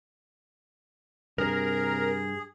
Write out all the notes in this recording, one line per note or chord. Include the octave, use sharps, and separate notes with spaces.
G2 C3 G#4 A#4